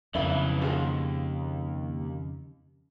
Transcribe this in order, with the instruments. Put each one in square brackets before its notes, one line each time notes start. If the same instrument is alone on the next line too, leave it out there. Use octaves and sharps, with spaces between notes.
[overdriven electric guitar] B1 E3 [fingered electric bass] F2 C#3 [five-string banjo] E5 F5 B5
[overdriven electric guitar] D#2 [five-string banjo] F4 F#4 G#4